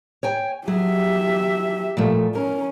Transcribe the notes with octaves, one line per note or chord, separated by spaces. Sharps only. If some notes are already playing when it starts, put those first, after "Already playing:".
C#5 G5 G#5
F#3 G4 G#4 E5
A#2 F3 A3
C#4 A#4